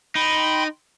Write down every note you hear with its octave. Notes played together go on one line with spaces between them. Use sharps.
D#4 G5 B5 C6